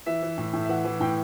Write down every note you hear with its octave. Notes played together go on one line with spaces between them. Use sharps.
E3 E5
E3
A2
A2
E5
E3 F#5
E3
A2 G5